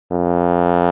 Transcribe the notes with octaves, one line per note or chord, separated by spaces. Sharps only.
F2